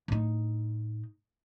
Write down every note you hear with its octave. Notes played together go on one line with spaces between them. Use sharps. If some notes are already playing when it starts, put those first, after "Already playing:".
A2 D#4